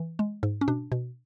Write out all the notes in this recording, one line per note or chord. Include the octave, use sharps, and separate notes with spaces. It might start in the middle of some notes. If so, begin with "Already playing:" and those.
Already playing: E3
G#3
G#2
C#4
B2 D4
B2